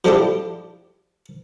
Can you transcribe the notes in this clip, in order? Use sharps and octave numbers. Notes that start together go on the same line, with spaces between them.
F3 A3 D4 E4 G4